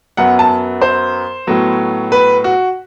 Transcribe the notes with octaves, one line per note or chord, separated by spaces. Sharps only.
F#2 F#3 B3 F#5
A5
C5
A2 F#3 B3
B4
F#4